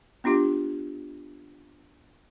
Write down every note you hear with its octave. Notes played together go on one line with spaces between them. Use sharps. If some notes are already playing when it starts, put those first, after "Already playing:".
B3 D4 F4 G4